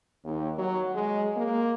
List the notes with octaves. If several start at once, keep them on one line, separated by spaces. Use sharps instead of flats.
D#2
F#3
G#3
A#3